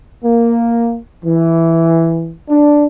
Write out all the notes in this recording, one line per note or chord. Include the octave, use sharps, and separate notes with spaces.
A#3
E3
D4